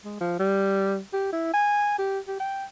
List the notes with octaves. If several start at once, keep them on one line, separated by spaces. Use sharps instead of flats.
G#3
F3
G3
G4
E4
G#5
G4
G4
G5